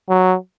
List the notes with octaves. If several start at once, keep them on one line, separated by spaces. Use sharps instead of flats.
F#3